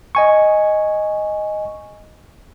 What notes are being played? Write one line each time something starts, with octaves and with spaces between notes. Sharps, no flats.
D#5 G#5 C#6